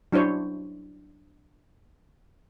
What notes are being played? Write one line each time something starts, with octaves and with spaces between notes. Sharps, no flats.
F#3 D4 E4 C5 C#5